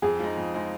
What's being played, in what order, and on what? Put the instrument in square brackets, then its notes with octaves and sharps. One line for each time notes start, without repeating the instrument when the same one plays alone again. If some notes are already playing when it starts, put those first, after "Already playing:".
[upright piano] F2 [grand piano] G#4
[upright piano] F3 G#3 D#4
F2
F3 G#3 D#4